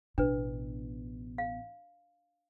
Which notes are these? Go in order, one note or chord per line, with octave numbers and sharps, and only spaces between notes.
A1 B2 D4 B4
F5